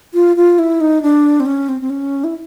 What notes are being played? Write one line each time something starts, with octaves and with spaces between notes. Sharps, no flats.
F4
F4
E4
D#4
D4
C4
C#4
C4
C4
C#4
E4